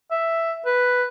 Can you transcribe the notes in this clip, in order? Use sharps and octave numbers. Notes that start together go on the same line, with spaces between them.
E5
B4